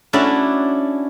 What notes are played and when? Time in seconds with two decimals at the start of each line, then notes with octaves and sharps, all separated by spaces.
0.13 A3 C#4 D4 E4 F#4 D5